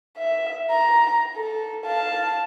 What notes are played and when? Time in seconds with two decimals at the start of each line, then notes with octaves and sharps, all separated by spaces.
0.17 E5
0.71 A#5
1.35 A4
1.85 F5 A5